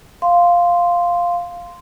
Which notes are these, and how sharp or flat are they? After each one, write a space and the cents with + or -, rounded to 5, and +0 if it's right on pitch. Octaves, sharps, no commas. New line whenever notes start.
F5 +0 C6 -5